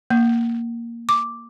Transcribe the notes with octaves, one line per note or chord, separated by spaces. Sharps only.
A#3
D6